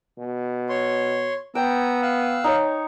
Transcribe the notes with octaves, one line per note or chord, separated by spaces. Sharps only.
B2
C#5 C6
B3 G5 A#5 E6
F5 E6 F#6
D#4 C#5